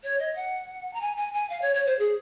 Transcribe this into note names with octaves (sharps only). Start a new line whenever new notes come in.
C#5
D#5
F#5
A#5
G#5
G#5
G#5
F5
C#5
C#5
C5
G#4